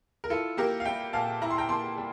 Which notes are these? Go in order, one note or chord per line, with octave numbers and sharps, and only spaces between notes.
A#4
E4 F4 A4
A#3 G4 A#4
F5
G3 E5 G5
A#2 F5 A5
E4 A#5
C6
G5 A#5
A#3 A5 C6
G3